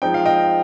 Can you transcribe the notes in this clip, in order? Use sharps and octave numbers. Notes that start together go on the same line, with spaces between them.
F3 G#3 C4 D#4 G5
F5
D#5 G5